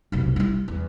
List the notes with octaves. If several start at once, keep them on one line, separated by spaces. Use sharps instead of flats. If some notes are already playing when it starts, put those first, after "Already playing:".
F1 B1
G3 E4
E2